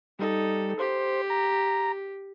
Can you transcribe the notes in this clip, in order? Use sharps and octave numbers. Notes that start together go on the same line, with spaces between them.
G3 D#4 A4
G4 C5
A#5